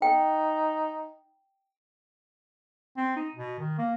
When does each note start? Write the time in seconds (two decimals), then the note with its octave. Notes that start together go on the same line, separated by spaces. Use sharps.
0.02 D#4 G5
2.97 C4
3.16 D#4
3.35 B2
3.59 D#3
3.78 A#3